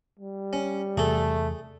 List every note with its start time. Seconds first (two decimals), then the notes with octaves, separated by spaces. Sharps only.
0.19 G3
0.53 C#4
0.97 E2 C3 E3 A3 G#4 A4